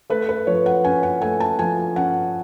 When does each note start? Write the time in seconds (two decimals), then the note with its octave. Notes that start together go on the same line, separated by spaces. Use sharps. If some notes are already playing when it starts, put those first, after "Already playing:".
0.10 A3 B4
0.29 B4
0.47 F3 C#5
0.66 F#5
0.84 C#4 G#5
1.03 F#5
1.22 A3 G#5
1.40 A5
1.59 F3 G#5
1.96 C#4 F#5